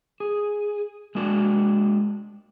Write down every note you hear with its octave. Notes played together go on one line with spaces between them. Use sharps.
G#4
G#3 A#3 D4 F#4